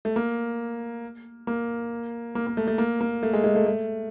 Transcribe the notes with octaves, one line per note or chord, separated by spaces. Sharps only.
A3
A#3
A#3
A#3
A#3
A3
A3
A#3
A#3
A3
G#3
G#3
A3
A3